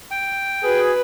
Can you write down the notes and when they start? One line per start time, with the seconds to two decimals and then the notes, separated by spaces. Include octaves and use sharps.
0.11 G5
0.64 F#4 G#4 B4